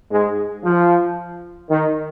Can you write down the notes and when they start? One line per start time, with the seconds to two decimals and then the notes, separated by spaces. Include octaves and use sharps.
0.10 G#2 G#3
0.64 F3
1.70 D#3